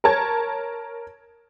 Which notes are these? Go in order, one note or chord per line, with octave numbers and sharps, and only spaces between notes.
A#4 C#5 A5 G#6